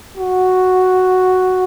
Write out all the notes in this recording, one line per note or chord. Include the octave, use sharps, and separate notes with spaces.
F#4